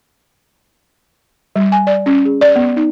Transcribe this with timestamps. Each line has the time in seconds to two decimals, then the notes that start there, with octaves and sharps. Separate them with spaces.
1.56 G3
1.72 G#5
1.87 D5
2.06 C#4
2.25 G#4
2.41 D5
2.56 B3
2.76 D#4